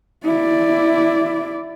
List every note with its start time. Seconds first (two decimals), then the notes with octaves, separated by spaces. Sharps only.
0.25 E4 D5